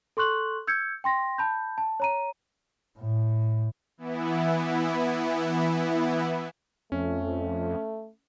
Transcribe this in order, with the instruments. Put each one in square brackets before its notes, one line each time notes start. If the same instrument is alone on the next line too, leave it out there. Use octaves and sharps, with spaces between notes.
[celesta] A4 C6 C#6 F#6 F#7
E6 G6 G#6 C#7
G5 C6 A#6
A5 B5 G6
A5
C#5 A#5 D#7
[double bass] A2
[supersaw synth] E3 B3 E4
[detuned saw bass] F2 [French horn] A3 [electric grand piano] C#4